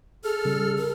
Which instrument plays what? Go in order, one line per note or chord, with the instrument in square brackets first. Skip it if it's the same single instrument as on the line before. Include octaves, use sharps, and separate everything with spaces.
[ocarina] G#4 [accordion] A4 F6
[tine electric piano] C#3 G3
[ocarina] A#4